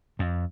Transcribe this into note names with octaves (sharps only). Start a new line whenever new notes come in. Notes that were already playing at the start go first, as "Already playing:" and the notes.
F2